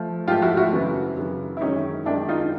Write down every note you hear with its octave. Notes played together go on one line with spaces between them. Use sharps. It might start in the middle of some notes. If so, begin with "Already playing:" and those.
Already playing: F3 A3
G#2 F3 A3 F4 G4
E4 F#4
E4 F#4
F#2 C#3 E3
F#2 C#3 E3
E4
F#2 D#3 G#3 C#4 D#4
F#2 D#3 G#3 D4 E4
D#4 F4